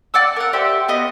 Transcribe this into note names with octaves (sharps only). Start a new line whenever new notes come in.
D5 F#5 D6 E6
A#4 F#5
G4 C5 D5 E5
B3 F#4 D#5 F5